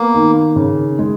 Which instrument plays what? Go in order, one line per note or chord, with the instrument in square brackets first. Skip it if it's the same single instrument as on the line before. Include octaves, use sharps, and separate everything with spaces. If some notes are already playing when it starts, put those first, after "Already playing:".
Already playing: [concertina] A#3 [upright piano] B3
[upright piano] D#3
C#3
G#3